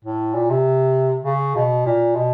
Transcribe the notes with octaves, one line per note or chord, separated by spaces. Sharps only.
A2
A#2
C3
C#3
B2
A#2
B2